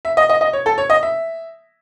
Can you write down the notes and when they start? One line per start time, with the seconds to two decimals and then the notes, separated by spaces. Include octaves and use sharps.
0.05 E5
0.17 D#5
0.29 D#5
0.41 D#5
0.53 C#5
0.66 A4
0.78 C#5
0.90 D#5
1.03 E5